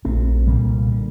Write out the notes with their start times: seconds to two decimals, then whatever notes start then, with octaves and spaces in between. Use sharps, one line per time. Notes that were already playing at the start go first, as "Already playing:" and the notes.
0.05 A#1 A#2 A3 C4
0.47 C2 A#2 G3 A#3
0.92 D3